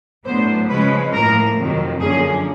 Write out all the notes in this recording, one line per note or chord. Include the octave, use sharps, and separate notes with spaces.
A2 F#3 B3 D4 C5
C#3 F3 G#3 C#4 B4
A2 F3 A#3 A#4
F2 C3 D#3 F#3
F#2 D3 F3 A#3 C#4 G#4